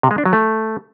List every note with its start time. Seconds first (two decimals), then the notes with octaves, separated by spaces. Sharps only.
0.03 C3
0.11 G#3
0.18 D4
0.26 F#3
0.33 A3